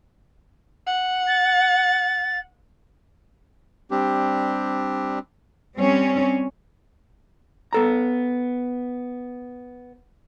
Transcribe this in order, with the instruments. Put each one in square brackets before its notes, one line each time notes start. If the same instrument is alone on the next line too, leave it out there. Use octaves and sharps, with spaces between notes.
[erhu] F#5
[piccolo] A6
[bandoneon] G3 C4 D4 G4
[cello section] G3 C4 C#4
[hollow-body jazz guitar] B3 A4 A#5